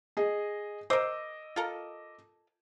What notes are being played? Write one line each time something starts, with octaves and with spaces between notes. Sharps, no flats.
G#4 D#5
A#4 C5 D#5 D6 E6
F4 A4 A#4